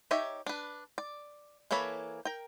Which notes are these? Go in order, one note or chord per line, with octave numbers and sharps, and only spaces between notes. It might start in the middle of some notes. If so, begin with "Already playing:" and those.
D#4 G4 C#5 E5
D4 B4
D5
E3 A#3 A4 C#5 B5
A#4 G5